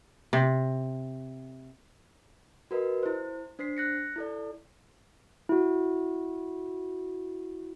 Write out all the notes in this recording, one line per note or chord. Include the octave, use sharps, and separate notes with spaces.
C3
F#4 A#4 B4 D#5
E4 C5
D4 C5 B6 C7
F#6 A#6 C#7
E4 A4 D5
E4 F#4